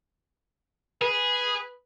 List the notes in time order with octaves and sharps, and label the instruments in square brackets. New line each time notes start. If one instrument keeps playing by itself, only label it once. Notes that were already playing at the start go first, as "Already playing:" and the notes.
[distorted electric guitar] G#4 [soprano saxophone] B4